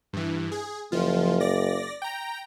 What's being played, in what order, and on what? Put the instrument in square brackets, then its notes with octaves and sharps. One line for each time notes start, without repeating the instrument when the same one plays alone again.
[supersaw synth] G2 E3
G#4
[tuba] F#1 [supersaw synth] F3 F4
[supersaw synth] D5 A#6
G5 A#5